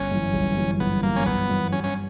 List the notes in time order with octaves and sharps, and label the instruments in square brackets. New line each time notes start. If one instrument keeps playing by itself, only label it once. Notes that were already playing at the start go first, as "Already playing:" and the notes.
Already playing: [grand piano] G1 [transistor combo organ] C#4
[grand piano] F#2 E3
G1
F#2 E3
[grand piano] G1 [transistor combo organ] B3
[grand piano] F#2 E3 [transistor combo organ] A#3
[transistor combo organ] C#4
[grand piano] G1 [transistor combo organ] B3
[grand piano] F#2 E3
[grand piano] G2 [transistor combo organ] C#4
[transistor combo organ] C#4